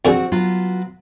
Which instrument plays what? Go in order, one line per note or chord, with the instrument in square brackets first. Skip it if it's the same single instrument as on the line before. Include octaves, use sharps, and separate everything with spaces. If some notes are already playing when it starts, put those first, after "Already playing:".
[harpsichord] F2 D3 G#4 [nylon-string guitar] C4 F#4
[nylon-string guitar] F#3 B3 F4